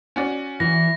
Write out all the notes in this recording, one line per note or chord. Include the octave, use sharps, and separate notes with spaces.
C#4 F#4 D5
E3 A#6